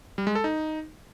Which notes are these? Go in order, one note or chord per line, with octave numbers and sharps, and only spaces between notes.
G3
G#3
A4
D#4